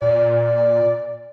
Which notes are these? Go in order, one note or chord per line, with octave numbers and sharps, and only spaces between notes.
A#2 D5